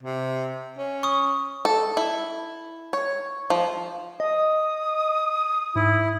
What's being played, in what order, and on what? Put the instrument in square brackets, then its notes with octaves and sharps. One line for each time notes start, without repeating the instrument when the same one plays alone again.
[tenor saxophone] C3
C#4
[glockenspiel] C#6 D#6
[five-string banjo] A4
E4
C#5
F3
[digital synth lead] D#5 [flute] D#6
[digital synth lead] G#2 [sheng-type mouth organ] E4